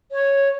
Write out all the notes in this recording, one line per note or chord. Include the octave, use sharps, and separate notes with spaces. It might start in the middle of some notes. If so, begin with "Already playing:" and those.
C#5